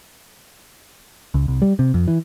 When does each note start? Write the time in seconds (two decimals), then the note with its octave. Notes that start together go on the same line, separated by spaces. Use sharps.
1.34 C#2
1.48 C2
1.62 G3
1.79 C3
1.94 F2
2.08 E3